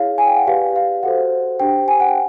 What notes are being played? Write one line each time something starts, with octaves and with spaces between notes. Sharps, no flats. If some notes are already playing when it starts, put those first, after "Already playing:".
Already playing: E4 G#4 C#5 F5
G#5
G5
F#5
G4 B4 D5 F5
F5
F#4 A4 C5 F#5
D4 G4 C5 G5
G#5
F#5
G5